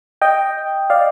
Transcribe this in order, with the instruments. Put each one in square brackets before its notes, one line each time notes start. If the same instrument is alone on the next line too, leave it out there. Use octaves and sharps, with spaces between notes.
[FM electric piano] D#5 G5
D5 F5